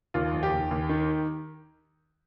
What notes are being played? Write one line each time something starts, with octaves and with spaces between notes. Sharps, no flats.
D#2 F4
F1
G4
D#2
D#2
D#3